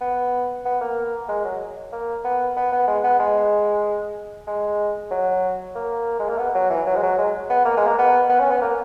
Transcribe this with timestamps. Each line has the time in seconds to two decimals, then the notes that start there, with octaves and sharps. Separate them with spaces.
0.01 B3
0.65 B3
0.81 A#3
1.28 G#3
1.45 F#3
1.92 A#3
2.24 B3
2.57 B3
2.72 B3
2.87 G#3
3.04 B3
3.19 G#3
4.47 G#3
5.11 F#3
5.75 A#3
6.19 G#3
6.29 A#3
6.38 B3
6.55 F#3
6.70 E3
6.86 F#3
6.96 G#3
7.03 F#3
7.18 G#3
7.50 B3
7.65 A#3
7.77 G#3
7.87 A#3
7.98 B3
8.29 B3
8.40 C#4
8.51 B3
8.61 A#3